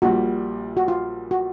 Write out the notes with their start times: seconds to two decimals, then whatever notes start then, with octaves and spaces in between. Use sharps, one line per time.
0.02 A#1 A#2 G3 F#4
0.77 F#4
0.88 F4
1.31 F#4